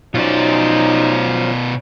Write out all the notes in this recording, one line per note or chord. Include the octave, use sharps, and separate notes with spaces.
B2 F#3 C#4 D#4 F4 C5 D5